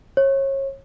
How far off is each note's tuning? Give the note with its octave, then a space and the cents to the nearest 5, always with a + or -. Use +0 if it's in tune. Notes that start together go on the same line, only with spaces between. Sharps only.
C#5 -30